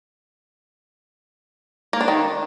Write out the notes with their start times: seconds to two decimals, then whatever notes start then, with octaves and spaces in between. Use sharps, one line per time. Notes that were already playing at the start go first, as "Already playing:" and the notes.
1.93 A#3
2.01 D4
2.08 D#3